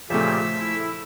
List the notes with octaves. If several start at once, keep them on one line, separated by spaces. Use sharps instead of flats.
A#2 C#3 F3 A3 G4 E5 E6
E4